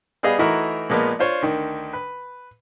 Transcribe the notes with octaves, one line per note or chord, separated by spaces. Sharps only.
G3 B3 G#4 D#5 F5
E3 A3 D#4 E4 F#4 A#4
A#2 F3 G#3 A#3 B3
D4 F4 C5 C#5
D2 D#3
B4